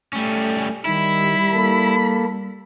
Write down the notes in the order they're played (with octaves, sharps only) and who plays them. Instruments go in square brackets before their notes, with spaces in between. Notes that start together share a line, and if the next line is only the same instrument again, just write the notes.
[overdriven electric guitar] G3 C#4 [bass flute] A3
[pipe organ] D#3 [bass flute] G3 [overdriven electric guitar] E4 [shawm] B5
[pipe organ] A#3 A4